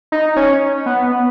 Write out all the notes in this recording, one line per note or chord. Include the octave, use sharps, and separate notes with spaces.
D#4
C#4
B3